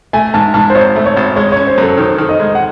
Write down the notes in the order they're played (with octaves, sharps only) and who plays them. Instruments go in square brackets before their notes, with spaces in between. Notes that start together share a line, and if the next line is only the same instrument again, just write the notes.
[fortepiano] A3 [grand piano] G#5
[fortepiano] G#2 [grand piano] A5
[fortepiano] G#2 [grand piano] A5
[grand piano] C5
[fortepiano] G#1 [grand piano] C#5
[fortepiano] A3
[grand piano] C#5
[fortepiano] G#1
[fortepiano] G#3 [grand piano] C#5
[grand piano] C#5
[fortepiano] C#4
[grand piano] C5
[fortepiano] F#2
[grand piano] A4
[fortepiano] D#3 [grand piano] C5
[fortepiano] D#3
[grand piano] D#5
[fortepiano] G#3
[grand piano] F#5